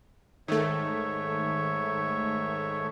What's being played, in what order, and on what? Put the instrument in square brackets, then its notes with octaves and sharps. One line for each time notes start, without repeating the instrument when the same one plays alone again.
[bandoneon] G#2 C#5 E5 [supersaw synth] D#3 A3